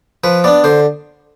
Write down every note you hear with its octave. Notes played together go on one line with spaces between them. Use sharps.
F3 B4
B3 D4 D5
D3 C5